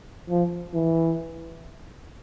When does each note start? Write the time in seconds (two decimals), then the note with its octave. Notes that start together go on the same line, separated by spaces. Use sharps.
0.30 F3
0.74 E3